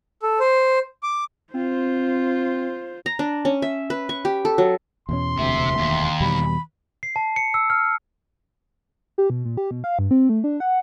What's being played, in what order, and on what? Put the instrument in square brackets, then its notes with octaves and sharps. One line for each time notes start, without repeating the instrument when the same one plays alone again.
[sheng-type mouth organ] A4
C5
D6
[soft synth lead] C4 [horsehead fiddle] F4 C5
[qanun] A#5
D4
C#4
E5
B4
C#6
G4
A4
F#3
[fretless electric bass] E2 B2 C#4 [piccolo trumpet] C6
[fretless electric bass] E1 D2 [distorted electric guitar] C3 [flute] E5
[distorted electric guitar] D#2
[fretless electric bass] E2 B2 G3 [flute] B5
[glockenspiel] C7
A5
C#7
E6
F6
[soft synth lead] G4
B2
A#2
G4
B2
F5
G2
C4
A3
D4
F#5